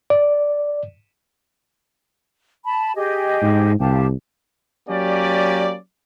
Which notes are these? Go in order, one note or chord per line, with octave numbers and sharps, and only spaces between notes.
D5
A5 B5
G4 G#4 D#5
G#2
C2 G4 F5 A5
F#3 A#3 C#4 G4 D5